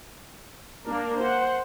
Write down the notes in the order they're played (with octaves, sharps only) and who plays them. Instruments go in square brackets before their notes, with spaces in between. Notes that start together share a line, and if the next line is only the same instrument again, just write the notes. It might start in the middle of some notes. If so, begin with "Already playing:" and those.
[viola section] A#3 D4 A#4
C5 F#5